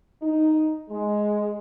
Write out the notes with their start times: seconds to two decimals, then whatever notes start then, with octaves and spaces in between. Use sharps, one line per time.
0.22 D#4
0.89 G#3